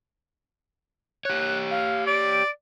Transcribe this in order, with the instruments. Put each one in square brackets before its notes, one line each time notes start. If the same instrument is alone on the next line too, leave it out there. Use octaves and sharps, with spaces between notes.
[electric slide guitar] G4 C#5 [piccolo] F#6
[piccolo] F5
[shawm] D5 [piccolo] D7